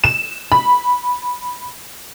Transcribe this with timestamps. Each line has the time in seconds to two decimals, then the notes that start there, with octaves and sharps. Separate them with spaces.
0.04 E7
0.52 B5